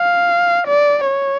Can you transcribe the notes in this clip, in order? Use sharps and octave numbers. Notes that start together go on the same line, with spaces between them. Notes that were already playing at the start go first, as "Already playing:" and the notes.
Already playing: F5
D5
C#5